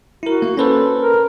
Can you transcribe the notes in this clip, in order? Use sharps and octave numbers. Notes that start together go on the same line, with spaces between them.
E4 F#4 A#4
A#3
C#4 A4 B4 C5
A#4